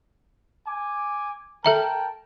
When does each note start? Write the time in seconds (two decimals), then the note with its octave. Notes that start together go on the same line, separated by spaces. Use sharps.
0.67 G#5 D6
1.64 A4 A#4 E5 G5 A5 A#5